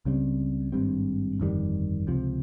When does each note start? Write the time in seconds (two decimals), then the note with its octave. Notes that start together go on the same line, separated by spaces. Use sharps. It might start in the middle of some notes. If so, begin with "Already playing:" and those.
0.05 C#2 C#3 G3 C4
0.72 G#1 G2 G3 C4
1.40 G1 F2 D#3 G3
2.07 C#2 C3 F3